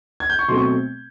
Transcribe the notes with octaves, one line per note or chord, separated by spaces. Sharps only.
G#6
G6
C#6
B2 F#3 A3 C4 C6
C#6